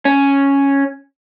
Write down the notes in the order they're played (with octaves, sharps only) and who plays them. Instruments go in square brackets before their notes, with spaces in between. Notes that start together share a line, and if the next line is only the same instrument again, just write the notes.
[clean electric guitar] C#4